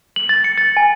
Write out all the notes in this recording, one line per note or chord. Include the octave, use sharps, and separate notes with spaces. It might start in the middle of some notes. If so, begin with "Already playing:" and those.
F#7
A6
C#7
A6
G#5